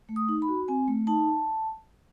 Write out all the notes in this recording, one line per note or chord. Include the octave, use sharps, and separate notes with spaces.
A3
D#6
D#4
B5
F#4
C4 G#5
A3
D#4 A5